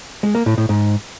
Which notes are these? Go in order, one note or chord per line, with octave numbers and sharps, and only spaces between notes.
G#3
A#3
A2
A2
G#2